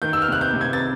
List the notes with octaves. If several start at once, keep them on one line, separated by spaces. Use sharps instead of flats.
D#3 G6
E6
F6
C3 F#6
G6
C3
G#6
A6